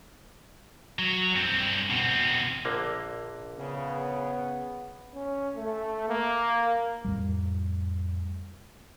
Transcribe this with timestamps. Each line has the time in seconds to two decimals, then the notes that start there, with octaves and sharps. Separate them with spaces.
0.99 F#3
1.36 G2 C4
1.90 B2 C4
2.65 A#1 D3 A#3
3.59 C#3 B3
5.15 C#4
5.56 A3
6.09 A#3
7.04 F2 A2 G3